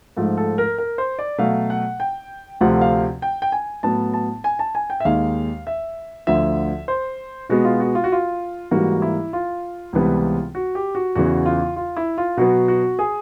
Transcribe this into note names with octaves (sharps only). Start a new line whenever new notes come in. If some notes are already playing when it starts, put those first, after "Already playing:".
G#2 F3 A3
A4
A#4
A#4
C5
D5
B2 F#3 A3 F5
F#5
G5
D2 C3 F3 A3 F#5
F5
G5
G5
G#5
A2 F#3 B3 A5
A5
G#5
A5
G#5
G5
E5
D#2 D#3 G#3 F5
E5
D2 D3 F3 E5
C5
B2 G#3 B3 F#4
F4
F#4
F4
F#4
F4
G#2 E3 G3 A#3 F#4
E4
F4
C#2 C3 E3 G3 B3
F#4
G4
F#4
E2 C#3 E3 F#4
F4
F4
E4
F4
B2 F#3 B3 F#4
F#4
G#4